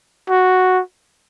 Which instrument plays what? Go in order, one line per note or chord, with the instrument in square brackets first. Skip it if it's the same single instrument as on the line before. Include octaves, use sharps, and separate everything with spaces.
[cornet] F#4